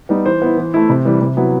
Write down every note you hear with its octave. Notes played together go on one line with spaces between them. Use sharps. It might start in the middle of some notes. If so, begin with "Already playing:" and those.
G3 B3 D#4
E3 C5
B3 E4
E3
A3 E4
C3
E3 G3
C3
F#3 B3 E4